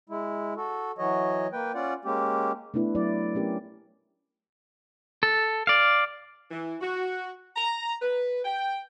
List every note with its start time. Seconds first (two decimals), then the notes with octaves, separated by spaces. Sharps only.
0.09 G#3 E4
0.57 F#4 A4
0.98 E3 F#3 F#4 C#5 D#5
1.53 A#3 B4 G5
1.75 C#4 F4 D5 F#5
2.05 G#3 A#3 C#4 G4
2.74 A3 B3 D4 E4 B4
2.95 F#3 E4 D5
3.35 A3 C#4 G4 A#4
5.23 A4
5.67 D5 F5
6.51 E3
6.81 F#4
7.56 A#5
8.01 B4
8.45 G5